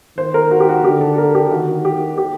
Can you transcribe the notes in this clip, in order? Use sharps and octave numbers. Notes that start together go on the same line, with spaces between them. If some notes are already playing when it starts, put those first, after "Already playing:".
D#3 C5
A#4
F#4
G4
F#4
D3 G4
A4
A#4
G4
D#3 F#4
G4
G4